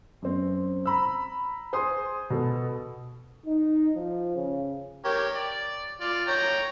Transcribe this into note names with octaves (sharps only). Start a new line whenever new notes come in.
F#2 C4
A#5 B5 E6
G#4 C5 C6 D#6
B2 A4
D#4
F3
C#3
G4 A#4 C#5
D5
F4 D5
C#5 G5 A#5